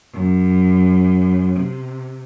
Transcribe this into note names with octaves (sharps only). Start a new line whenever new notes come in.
F#2
C3